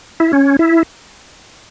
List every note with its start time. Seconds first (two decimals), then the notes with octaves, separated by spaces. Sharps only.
0.20 E4
0.33 C#4
0.59 E4